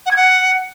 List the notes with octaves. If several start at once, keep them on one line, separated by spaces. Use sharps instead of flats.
F#5
G#6
F#5